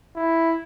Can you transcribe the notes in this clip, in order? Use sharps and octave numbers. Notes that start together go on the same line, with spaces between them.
E4